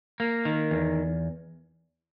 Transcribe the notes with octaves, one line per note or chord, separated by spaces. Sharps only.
A#3
D#3
E2